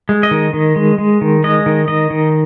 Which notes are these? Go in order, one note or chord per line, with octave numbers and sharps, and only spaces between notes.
G#3
D#5
D#3
D#3
G#3
G#3
D#3
G#3 D#5
D#3
D#3 D#5
D#3